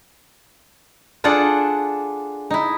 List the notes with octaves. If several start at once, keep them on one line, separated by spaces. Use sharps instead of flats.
D4 F4 G#4 A4 D5 F#5
D#4 E4